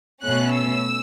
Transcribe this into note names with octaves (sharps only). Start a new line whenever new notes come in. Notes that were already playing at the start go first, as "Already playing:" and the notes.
B2 A3 C#4 F#6
E6